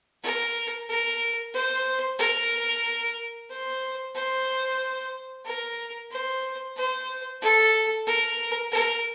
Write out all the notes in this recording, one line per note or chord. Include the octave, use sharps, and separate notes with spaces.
A#4
A#4
C5
A#4
C5
C5
A#4
C5
C5
A4
A#4
A#4